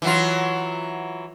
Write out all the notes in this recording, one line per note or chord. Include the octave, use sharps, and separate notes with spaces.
E3 F#3 F4